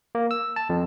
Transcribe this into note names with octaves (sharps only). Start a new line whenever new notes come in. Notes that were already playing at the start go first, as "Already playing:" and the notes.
A#3
E6
A5
F2